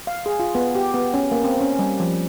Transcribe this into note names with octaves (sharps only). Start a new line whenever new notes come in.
F5
G#4
F4
B3
G4
B3
C#4
A#3
C4
C#4
G3
F3